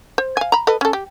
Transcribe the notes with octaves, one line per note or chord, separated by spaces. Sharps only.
C5
F5 G#5
A#5 B5
A4 B4 D#5
C#4 A4
G4